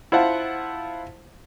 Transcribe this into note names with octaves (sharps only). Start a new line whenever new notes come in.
E4 F4 C5 F5 F#5 A5